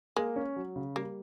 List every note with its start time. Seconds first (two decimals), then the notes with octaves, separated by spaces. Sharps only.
0.16 G#3 A#3
0.36 C#4
0.56 F#3
0.76 C#3
0.96 G3 A#3